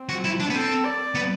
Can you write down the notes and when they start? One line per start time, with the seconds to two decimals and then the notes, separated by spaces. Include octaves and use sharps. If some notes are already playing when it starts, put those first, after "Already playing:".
Already playing: C4
0.09 F#4
0.24 E4
0.40 D4
0.50 B3
0.54 C4 A4
0.84 D5
1.15 B3